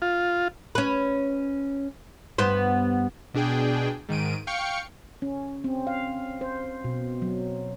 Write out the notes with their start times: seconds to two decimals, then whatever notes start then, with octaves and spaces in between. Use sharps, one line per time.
0.02 F4
0.75 C#4 B4
2.38 G2 B3 C5
3.34 B2 D4 G#4 G5
4.09 G#2 D#3 D7 D#7
4.47 F5 G5 C#6 C#7
5.22 C#4
5.64 C4
5.87 F5
6.41 C5
6.84 B2
7.22 F#3